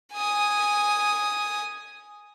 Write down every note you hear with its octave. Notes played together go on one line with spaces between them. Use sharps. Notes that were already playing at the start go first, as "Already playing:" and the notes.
G#5 D#6